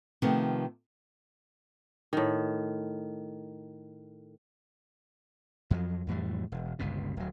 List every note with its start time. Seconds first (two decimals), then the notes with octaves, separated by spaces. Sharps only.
0.22 C3 D#3 F3 A3 B3
2.13 A2 D#3
5.71 F2 F3 F#3
6.07 F2 A2 E3 G3
6.52 E1
6.79 G1 C#2 G2 B2
7.17 D1 F#3